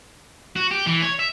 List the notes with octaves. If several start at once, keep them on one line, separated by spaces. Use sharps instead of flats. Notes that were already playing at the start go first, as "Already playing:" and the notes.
F#4
G4
E3
C#5
E5